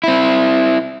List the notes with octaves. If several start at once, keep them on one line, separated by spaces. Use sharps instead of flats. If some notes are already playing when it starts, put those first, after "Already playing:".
C4 E4